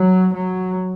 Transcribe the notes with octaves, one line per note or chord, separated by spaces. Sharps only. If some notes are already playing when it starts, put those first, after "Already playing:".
Already playing: F#3
F#3